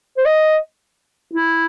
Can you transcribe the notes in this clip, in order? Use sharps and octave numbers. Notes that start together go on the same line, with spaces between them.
C5
D#5
E4